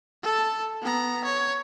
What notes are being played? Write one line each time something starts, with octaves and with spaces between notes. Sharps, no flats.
A4 A5
B3 A#5
C#5